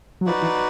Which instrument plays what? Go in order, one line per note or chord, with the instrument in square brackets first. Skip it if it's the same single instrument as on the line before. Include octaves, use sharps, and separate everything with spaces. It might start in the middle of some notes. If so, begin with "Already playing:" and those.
[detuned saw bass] F#3
[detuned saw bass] F3 [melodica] D#4 F#4 B4 D5
[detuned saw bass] E3